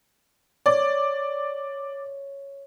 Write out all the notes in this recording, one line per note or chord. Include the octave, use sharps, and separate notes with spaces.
C#5 D5